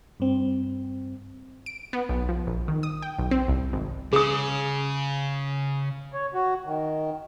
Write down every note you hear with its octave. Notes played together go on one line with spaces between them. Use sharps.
G2 C4
D7
B3
B1
F3
A#1
D#3
D#6
G5
B1
C4
C2
G#1
C#3 G#4 D#6
C#5
F#4
D#3